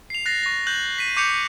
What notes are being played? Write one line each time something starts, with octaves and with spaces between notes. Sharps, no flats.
C7 F7
F#6 A6 A#6 C7
C#6 A#6
F#6 G6 F#7
B6 D#7
C#6 D6 G6 C#7 F7